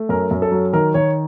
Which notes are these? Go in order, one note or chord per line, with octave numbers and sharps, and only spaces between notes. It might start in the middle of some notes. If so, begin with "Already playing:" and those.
Already playing: A3
F#2 A#4
F#2
A4
F#3
D#3 A#4
D#3 C#5